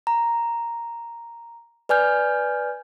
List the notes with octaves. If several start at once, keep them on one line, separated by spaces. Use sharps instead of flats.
A#5
B4 D5 G#5 F6 G6